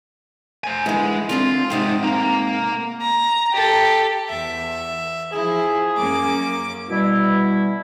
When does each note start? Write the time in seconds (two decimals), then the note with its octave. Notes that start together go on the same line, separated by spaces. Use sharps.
0.64 C5 G#5
0.86 D3 E3 G#3
1.29 D3 C4 D4 F4
1.70 G#2 C3 C4 D#4 F#4
2.03 A#3 A#5
3.01 A#5
3.52 G4 A4
4.29 E2 E5
5.33 F3 E4 G#4
5.98 F#2 A#3 C#4 D6
6.90 B2 G3 E4